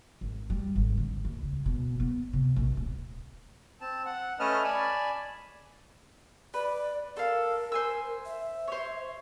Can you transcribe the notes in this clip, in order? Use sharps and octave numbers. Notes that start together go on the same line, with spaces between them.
G#1
G3
G#1
D3
D#2
C#2
B2
B3
C3
A#1
D1
C4 A5
F#5
A3 C#4 B4 D#5 A5 F6
D5 G#5 A5 B5
B4 D5
A4 A#4 F5
C5 G#5 E6
E5
C5 C#5